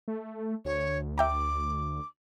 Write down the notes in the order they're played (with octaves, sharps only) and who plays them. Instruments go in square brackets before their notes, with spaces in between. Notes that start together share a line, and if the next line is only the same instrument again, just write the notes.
[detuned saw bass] A3
[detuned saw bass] D2 [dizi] C#5
[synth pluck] E5 G5 A#5 [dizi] D6